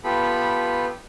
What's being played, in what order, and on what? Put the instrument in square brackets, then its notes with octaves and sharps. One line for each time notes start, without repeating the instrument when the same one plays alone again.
[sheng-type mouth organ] B3 F4 G4 A4 B5